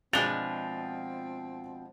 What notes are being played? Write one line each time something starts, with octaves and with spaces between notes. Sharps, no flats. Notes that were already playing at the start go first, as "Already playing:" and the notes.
B2 F3 G#3 C4 D4 A6 F7 G7